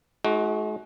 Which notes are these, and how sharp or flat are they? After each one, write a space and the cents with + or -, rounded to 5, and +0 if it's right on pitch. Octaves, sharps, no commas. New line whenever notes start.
G#3 +45 D#4 +15 F#4 +0